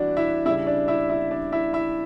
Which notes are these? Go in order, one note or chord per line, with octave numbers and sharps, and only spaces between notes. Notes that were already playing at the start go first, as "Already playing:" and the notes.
Already playing: E3 G3 D4 E4 F#4 D5
E4 E5
C#3 G3 D4 E4 E5
D4 D5
E4 E5
E4 E5
D4 D5
E4 E5
E4 E5